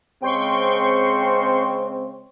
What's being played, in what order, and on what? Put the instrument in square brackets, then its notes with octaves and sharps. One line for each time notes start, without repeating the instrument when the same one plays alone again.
[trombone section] C#3 G#3 C4 [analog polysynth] G5 C6 C#6